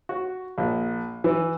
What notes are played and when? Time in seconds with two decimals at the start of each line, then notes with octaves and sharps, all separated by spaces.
0.09 F#4
0.58 A#1
1.24 E3